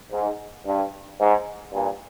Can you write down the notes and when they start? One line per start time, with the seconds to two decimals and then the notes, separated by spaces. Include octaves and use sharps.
0.12 G#2
0.66 G2
1.19 G#2
1.72 G2 A#2